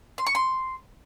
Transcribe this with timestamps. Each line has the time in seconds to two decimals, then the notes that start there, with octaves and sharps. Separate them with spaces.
0.18 C6
0.26 C#6
0.35 C6